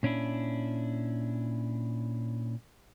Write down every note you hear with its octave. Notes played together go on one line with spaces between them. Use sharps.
A#2 C#4 D4 E4